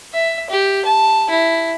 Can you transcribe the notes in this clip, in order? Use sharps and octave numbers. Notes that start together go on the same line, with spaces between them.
E5
G4
A5
E4